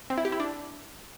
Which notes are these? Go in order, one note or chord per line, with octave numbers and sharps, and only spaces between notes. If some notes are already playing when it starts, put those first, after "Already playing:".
C4
E4
G4
E4
D4